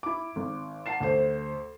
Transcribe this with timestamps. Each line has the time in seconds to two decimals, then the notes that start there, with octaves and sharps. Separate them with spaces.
0.03 E4 D6
0.36 G#1
0.86 F#5 A5 C7 E7
1.00 D2 C5